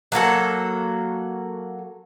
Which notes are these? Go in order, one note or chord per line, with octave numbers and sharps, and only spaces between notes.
F#3 A#3 F#4 A4